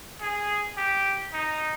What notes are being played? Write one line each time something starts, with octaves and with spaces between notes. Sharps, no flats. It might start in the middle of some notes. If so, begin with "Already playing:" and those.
G#4
G4
D#4